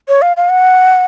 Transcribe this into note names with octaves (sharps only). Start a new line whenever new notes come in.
C#5
F5
F5
F#5